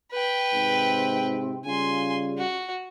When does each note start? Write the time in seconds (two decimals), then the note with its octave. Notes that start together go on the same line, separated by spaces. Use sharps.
0.12 B4 G5
0.54 G#2 C3 C4
1.65 C#3 G3 F4 G#5 C6
2.38 F#4